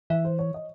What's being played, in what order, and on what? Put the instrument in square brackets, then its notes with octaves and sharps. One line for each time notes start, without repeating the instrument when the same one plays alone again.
[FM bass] E3 [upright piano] E5
[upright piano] C5
C#5
D#5